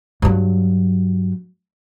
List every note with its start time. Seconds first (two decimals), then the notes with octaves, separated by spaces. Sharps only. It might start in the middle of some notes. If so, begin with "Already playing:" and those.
0.22 G2 F#3